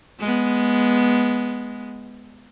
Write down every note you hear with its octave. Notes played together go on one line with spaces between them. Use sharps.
G#3 B3